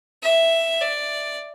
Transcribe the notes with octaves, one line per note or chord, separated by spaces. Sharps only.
E5
D5